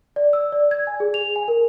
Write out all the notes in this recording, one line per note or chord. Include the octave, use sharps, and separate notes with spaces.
D5
E6
D5
G#6
G#5
G#4
F7
G#5
A#4